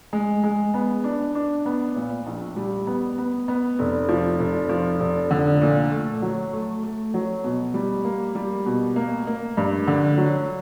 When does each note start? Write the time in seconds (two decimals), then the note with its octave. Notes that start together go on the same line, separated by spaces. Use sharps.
0.13 G#3
0.44 G#3
0.74 B3
1.04 D4
1.35 D4
1.66 B3
1.96 A#2
2.27 A#1
2.56 G3
2.87 B3
3.18 B3
3.48 B3
3.79 F1
4.09 F3
4.39 F1
4.69 F3
5.00 F1
5.31 D3
5.61 A#2
5.91 A3
6.22 F#3
6.53 A3
6.83 A3
7.14 F#3
7.44 B2
7.74 G3
8.05 A#3
8.35 G3
8.66 B2
8.96 A#3
9.27 A#3
9.57 G2
9.87 D3
10.17 F#3